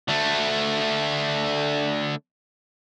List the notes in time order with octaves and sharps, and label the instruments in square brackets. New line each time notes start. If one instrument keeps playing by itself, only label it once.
[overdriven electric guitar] D3 A3